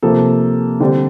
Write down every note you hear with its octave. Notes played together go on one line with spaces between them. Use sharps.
C3 F3 A#3 A4
D3 G3 C4